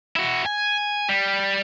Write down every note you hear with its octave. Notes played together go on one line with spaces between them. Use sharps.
E4 F#4
G#5
G3